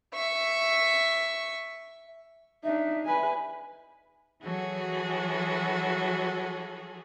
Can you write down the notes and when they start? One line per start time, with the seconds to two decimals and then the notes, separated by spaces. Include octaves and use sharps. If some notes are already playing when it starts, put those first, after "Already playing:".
0.14 E5 C#6
2.64 D4 D#4 E5
3.05 B4 G#5
4.41 E3 F#3 F#4 G#4 A4